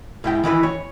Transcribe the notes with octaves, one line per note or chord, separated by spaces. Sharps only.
G#2 E4 G5
D#3 E3 E4 B4
C#5